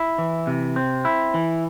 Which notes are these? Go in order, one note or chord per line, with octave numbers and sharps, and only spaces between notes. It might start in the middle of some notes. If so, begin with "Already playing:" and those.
Already playing: E4
E3
C3
C4
E4
E3